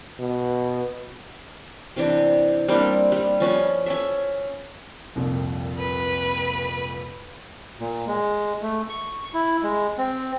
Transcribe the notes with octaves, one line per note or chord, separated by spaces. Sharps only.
B2
C3 E3 D4
G3 A#3 C4 D4
G3
F3 C#4 B4
C#4 A4 E5
C2 F2 A#2
B4
A#2
G#3
A3
C#6
E4
G#3
C4